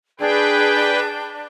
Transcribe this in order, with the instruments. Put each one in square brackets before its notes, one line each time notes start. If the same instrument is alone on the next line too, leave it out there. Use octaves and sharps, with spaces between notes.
[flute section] D4 [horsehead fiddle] G#4 [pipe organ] B4 G5